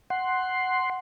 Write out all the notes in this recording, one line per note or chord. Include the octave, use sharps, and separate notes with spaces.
F#5 C6